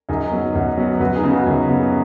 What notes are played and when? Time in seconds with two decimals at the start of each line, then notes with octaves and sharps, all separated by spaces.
0.09 F#2 D#4 G#4
0.31 F#3 B3
0.54 F#2 F#4
0.77 F#3 B3
1.00 F#2 F#4 B4
1.15 D#4 G#4
1.24 C#3 B3
1.31 F#4 B4
1.46 F#2
1.69 C#3 B3